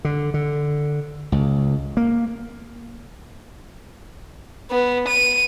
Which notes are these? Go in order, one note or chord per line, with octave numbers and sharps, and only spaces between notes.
D3
D3
C#2
A#3
B3
D#7